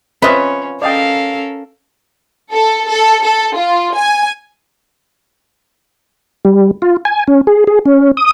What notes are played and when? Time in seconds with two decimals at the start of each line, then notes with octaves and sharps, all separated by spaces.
0.22 C4 C#4 F4 B4 D#5 E5
0.82 C#4 A4 A#4 D5 D#5 F5 G5
2.53 A4
2.89 A4
3.24 A4
3.56 F4
3.96 G#5
6.45 G3
6.82 F4
7.05 G#5
7.27 C#4
7.47 G#4
7.67 G#4
7.85 C#4
8.17 D#6